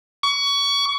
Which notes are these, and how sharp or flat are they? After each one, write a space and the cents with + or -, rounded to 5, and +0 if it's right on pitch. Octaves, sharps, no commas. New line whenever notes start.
C#6 +25